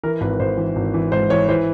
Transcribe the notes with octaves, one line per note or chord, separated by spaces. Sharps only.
E3 A#4
G#1 B4
G#1 C5
E3
G#1
E3
G#2 C5
E3 C#5
E3 C5